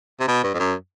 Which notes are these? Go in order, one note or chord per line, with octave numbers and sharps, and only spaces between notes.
C3
B2
G2
F2
F#2